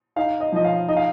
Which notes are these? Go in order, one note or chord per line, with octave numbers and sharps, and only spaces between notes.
D#4 F5
D#5
F3 D#5
F5
D#4 D#5
F5